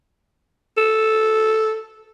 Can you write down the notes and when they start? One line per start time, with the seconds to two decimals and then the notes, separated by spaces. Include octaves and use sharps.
0.77 A4